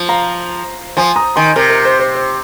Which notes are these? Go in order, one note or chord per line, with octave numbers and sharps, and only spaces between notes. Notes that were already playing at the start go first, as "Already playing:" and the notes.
Already playing: F3
F5 A#5
F3 G#5 C6
A#5 D#6
D#3 G#5 C6
C3 A#4
A#4
C5
C5
C5